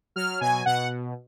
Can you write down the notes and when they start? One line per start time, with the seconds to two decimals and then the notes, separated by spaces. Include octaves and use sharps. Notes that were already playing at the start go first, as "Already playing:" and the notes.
0.16 F#3 F6
0.41 B2 G#5
0.66 B2 F#5